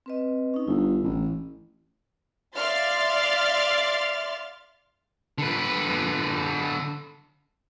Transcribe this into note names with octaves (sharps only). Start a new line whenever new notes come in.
C4 B4 D#5
C#4 D#4
G1 E4
A1
D5 E5 F5 C6 F6 A6
D3 B4